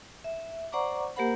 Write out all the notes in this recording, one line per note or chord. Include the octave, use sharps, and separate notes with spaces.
E5
C5 D5 F#5 A#5 C#6 D6
A#3 G4 A#4 C5 F#5 B5